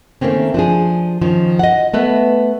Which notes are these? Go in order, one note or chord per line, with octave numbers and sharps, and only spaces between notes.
D#3 A3 A#3 C4 C#4
F3 D4 G#4
D#3 F3 C#4
D#5 F#5
A3 B3 B4